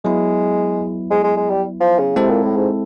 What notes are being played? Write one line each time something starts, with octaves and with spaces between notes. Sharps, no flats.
F#3 G#3 B3 E4
G#3
G#3
G#3
G3
F3
C#3
C3 G#3 C4 E4 A4
A#2
A2
G#2